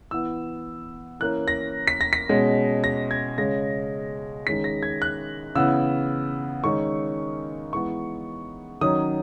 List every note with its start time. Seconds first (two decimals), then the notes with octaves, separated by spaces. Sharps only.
0.11 E3 B3 E6
1.20 E3 A#3 C#4 F#6
1.48 A#6
1.88 B6
2.01 A#6
2.13 B6
2.29 B2 G#3 C#4
2.84 A#6
3.11 G#6
3.38 C#3 G#3 C#4 A#6
4.47 D#3 G#3 C#4 B6
4.64 A#6
4.83 G#6
5.02 F#6
5.55 C#3 E3 B3 E6
6.64 D#3 G#3 C#4 C#6
7.73 E3 G#3 B3 C#6
8.81 D#3 F#3 C#4 D#6